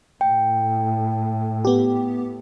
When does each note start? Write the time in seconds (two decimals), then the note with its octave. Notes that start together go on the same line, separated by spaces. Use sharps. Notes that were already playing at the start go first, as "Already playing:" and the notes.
0.21 A2 G5
1.65 B3 G4